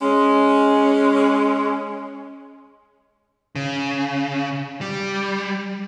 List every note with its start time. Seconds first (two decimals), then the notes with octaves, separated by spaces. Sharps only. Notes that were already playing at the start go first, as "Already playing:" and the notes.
0.02 G#3 C#4
3.56 C#3
4.81 G3